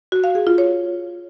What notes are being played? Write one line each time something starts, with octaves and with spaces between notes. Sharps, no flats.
F#4
F5
G#4
F4
C#5